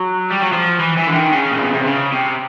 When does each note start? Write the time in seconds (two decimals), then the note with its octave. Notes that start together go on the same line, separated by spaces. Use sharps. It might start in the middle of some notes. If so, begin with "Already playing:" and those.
Already playing: F#3
0.30 G3
0.41 F#3
0.52 F3
0.80 E3
0.97 E3
1.07 D3
1.14 D#3
1.32 C#3
1.51 A#2
1.62 B2
1.74 C3
1.86 C#3
2.13 C3